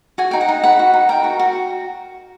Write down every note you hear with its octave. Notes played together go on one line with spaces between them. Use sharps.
F#4 G#5
D#4 G5
F#5
D#4
B4 F#5
F#4
D#4
A#4 G5
F#4
F#4